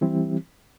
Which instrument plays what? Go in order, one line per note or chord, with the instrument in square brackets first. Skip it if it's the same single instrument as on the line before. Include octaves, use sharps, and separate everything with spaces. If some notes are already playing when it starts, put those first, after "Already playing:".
[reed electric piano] E3 G3 C4 E4 G4